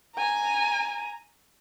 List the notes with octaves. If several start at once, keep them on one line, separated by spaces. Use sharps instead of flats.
G#5 A#5